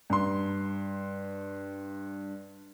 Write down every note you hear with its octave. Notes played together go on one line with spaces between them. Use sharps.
G2 C6